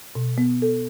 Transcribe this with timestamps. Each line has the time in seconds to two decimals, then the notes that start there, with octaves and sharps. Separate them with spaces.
0.15 B2
0.38 B3
0.62 A4